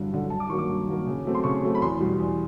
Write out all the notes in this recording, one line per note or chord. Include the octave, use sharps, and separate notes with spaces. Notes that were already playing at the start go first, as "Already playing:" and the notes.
Already playing: G2 D3 F#3
D3 F#3
G2 A5
D6
D#3 F#3 A#3 C#6
D6
G2
D#3 F#3 A#3
C#3
F#3 A3 C4
C6
C#3 C#6
F#3 A3 C4
B5
E2 C6
B2 G3
E2